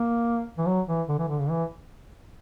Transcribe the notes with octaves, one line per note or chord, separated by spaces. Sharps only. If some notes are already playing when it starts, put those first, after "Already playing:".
Already playing: A#3
E3
F#3
E3
D3
E3
D3
C#3
E3